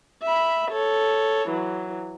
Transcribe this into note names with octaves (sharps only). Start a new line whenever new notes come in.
E5 B5
A4 C#5
E3 F#3